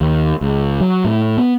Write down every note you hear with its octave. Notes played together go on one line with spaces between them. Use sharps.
D#2
C#2
F#3
A2
B3